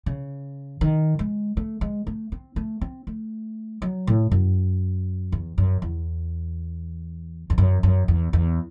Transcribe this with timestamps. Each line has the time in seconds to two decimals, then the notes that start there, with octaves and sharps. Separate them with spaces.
0.06 C#3
0.81 D#3
1.19 G#3
1.57 A3
1.81 G#3
2.07 A3
2.32 C4
2.56 A3
2.81 C4
3.07 A3
3.82 F#3
4.07 A2
4.31 F#2
5.32 E2
5.58 F#2
5.82 E2
7.50 E2
7.58 F#2
7.83 F#2
8.08 E2
8.33 E2